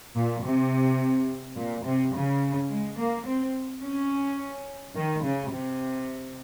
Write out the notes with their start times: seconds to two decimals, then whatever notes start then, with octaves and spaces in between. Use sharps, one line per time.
0.15 A#2
0.43 C3
1.56 A#2
1.84 C3
2.13 C#3
2.70 G#3
2.98 A#3
3.26 C4
3.82 C#4
4.95 D#3
5.24 C#3
5.52 C3